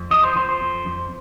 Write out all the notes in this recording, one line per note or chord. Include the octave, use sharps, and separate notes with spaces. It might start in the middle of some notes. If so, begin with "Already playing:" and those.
Already playing: F2
F3 D#5
C5
F3 C5
C5
F2
F2